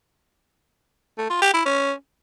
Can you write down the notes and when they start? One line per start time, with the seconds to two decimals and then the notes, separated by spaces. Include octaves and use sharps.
1.18 A3
1.30 F4
1.42 G4
1.54 E4
1.66 C#4